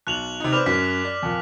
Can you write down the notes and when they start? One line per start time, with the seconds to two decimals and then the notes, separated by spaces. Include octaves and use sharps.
0.07 B1 F#6 F7 F#7
0.40 C3 D#4
0.53 C4 B4 D5 D6 F6 F7
0.66 F#2 B6
1.04 D5
1.23 F2 A#2